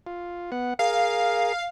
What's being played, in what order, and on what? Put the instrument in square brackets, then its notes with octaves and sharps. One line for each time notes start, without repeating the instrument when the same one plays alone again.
[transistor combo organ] F4
B3 F#5
[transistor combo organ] G#4 A#4 [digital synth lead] F5